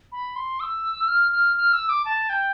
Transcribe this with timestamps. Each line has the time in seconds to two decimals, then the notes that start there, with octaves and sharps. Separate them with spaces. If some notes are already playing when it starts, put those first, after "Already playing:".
0.12 B5
0.36 C6
0.60 E6
1.08 F6
1.32 F6
1.57 F6
1.73 E6
1.89 D6
2.05 A5
2.29 G5